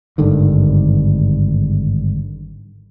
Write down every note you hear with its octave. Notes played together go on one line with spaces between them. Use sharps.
G#1 G2 D3 D#3